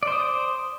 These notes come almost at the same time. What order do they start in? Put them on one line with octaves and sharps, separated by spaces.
D5 C5 D#6